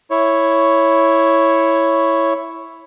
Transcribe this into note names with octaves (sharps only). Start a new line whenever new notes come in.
E4 C#5